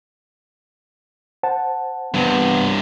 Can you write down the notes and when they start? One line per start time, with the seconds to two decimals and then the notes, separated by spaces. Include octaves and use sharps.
1.43 C5 F#5 A5
2.14 G2 C3 B3